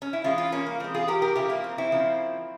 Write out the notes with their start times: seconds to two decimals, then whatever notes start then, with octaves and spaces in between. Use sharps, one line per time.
0.02 C#4
0.13 E4
0.24 E3 G#3 C#4 F4
0.38 C#4 F4
0.52 A#3 C#4
0.66 A#3
0.80 E3 G#3 C4
0.94 F4 G#4
1.08 G4 A#4
1.22 G4 A#4
1.36 C#3 F3 A#3 E4 G4
1.50 A#3
1.64 C4
1.78 C4 E4
1.92 C#3 F3 A#3